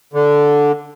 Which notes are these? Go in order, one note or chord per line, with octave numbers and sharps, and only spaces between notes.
D3